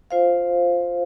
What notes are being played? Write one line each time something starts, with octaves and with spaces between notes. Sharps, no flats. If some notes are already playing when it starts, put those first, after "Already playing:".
F4 C5 F5